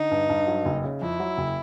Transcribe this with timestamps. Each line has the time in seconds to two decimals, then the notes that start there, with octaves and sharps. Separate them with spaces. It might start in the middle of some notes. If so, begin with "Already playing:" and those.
Already playing: D3 D#4
0.11 G2
0.29 G2
0.47 F#3
0.65 F#1
0.84 C#3
1.02 F2 E4
1.20 F#3
1.38 F#1